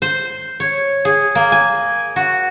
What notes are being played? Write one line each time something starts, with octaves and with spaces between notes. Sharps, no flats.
C5
C#5
G#4
A#3
G#5
F#4